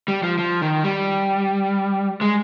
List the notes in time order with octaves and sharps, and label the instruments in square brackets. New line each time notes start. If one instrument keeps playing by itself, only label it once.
[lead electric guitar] G3
F3
F3
D#3
G3
G#3